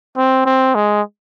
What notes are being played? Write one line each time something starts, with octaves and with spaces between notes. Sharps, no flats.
C4
C4
G#3